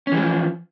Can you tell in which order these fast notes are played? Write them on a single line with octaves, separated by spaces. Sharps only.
C#4 E3 G3 F3